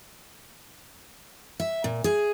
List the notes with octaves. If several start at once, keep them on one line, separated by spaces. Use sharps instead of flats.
E5
A#2
G#4